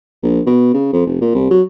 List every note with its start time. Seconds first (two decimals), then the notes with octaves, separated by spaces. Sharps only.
0.23 A#1
0.47 B2
0.74 C#3
0.93 F2
1.07 F1
1.21 A#2
1.35 C2
1.51 F#3